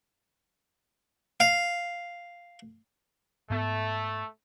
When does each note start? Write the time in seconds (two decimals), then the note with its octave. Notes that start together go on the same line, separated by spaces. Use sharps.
1.40 F5
3.50 G#2 A3 B3